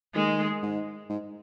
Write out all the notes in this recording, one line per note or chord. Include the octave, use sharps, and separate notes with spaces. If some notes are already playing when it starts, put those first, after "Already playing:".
D#3 G#3
G#2
G#2